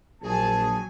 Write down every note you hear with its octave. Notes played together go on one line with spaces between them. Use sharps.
A#1 F#3 G#4 G#5 A5